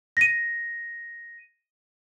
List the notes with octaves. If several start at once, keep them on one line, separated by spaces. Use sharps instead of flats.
A#6 D#7